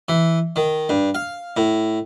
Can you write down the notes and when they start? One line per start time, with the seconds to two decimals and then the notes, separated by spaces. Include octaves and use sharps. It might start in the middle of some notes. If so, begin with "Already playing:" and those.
0.09 E3
0.56 D#3
0.89 G2
1.15 F5
1.57 A2